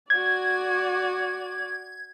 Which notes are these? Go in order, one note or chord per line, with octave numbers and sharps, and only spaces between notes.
F#4 D5 G#6